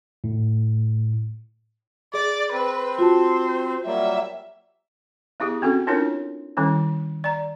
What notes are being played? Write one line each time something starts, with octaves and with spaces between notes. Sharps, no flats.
A2
G#4 D5 D6
C4 B4
F4 F#4 C5 A5
F#3 G3 A#3 E5
B3 E4 G4 G#4
C4 C#4 F#4 A4
C#4 D4 E4 F4 A#4 C#5
D#3 G3 C#4 E4
D5 A#5